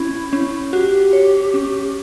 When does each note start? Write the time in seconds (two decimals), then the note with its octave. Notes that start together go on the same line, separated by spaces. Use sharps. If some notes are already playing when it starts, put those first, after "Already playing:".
Already playing: C#4 E4
0.33 C#4
0.73 F#4 G4
1.13 C#5
1.54 C#4